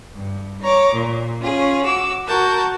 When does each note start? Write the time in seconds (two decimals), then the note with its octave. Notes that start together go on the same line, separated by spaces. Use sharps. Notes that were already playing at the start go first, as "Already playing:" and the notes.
0.14 G2
0.61 C#5 A#5 D6
0.93 A#2
1.42 C#4 F4 G#4
1.84 F#4 D6 E6
2.28 F#4 A#4 F#5 A5 G6